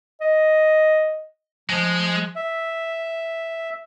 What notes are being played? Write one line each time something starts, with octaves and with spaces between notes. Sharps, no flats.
D#5
F3 G#3
E5